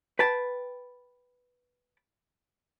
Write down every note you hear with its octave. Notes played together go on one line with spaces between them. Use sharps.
B4 G5 A5 B5